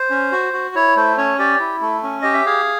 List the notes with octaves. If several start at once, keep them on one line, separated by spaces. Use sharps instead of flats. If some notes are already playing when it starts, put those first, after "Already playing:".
Already playing: C5
C#4
F#4
F#4
E4 C#5
A3 C5
C#4 C#5
G4 D5
E4
A3
C#4
G4 D#5
E5
G#4 F5